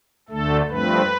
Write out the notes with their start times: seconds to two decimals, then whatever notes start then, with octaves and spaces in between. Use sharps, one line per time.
0.29 D2 D3 A3 A4
0.69 G2 F3 A3 C4 B4